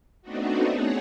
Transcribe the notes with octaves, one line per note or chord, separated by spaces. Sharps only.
A3 B3 C4 D4 D#4 F#4
G#4 C#5 F#5